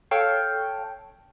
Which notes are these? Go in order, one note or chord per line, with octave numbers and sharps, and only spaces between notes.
A4 C#5 F5 G5